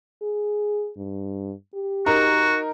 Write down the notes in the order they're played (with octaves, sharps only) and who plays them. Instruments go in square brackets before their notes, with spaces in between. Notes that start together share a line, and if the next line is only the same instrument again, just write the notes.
[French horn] G#4
G2
G4
[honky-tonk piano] D#4 A#4 [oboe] F#4